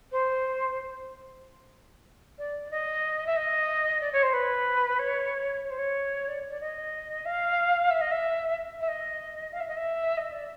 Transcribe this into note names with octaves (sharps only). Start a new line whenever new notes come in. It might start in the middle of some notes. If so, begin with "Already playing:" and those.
C5
D5
D#5
E5
D#5
D5
C#5
C5
B4
C#5
C#5
C5
C#5
D5
D5
D#5
F5
E5
D#5
E5
E5
D#5
F5
E5
D#5
E5
D#5
D5